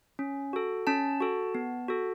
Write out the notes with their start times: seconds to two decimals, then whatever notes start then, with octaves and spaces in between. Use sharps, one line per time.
0.19 C#4
0.53 F#4 A4
0.87 C#4 A5
1.20 F#4 A4
1.55 B3
1.88 F#4 A4